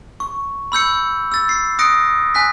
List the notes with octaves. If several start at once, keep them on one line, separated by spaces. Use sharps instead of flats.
C#6
B5 E6 G6 C#7
E6 A6
C7
D#6 F#6 A#6 C#7 D7
G#5 F#6 B6